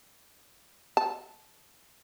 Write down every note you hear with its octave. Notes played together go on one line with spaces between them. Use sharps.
A5